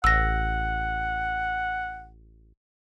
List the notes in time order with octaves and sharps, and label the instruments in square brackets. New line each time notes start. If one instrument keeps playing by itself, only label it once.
[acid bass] A1 [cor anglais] F#5 [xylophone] E6 A#6